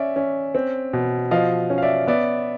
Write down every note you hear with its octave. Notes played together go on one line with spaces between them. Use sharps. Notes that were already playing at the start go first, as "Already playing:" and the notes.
Already playing: C#4 D5 E5
C#4
C4
B2
F3 D#5 F5
C#4
F5
D5 E5
B3 D5 E5